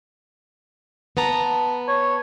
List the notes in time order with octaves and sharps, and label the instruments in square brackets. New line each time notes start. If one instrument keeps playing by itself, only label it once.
[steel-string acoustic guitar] B3 A5 A#5
[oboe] C#5